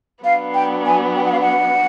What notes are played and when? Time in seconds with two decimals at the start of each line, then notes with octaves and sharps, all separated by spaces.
0.23 F#3 B3 D4 F5
0.54 G5
0.86 G#5
1.16 G5
1.24 F#5
1.32 F5
1.40 F#5